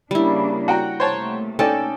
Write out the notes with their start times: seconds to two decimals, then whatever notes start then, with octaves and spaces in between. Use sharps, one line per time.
0.11 C#3 G3 A#3 D4 E4
0.68 F#4 F#5 G5 A#5
1.00 C3 A3 A#3 C5 C#5 A5
1.59 C#4 D#4 A4 D5 G5 A5